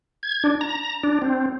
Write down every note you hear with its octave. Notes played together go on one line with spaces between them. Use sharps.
G#6
D4
A#5
D4
C4